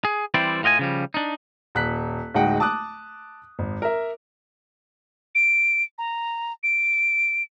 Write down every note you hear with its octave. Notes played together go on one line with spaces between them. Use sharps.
G#4
E3 G3 C4 E4 C5 D5
A2 F4 D#5 G5 G#5
C#3 F3 G3
D4 D#4
D#1 F#6 B6
D1 G#3 D#4 F#5 G5
A5 D6 D#6 F#6
G#1
A#4 E5
D7
A#5
D7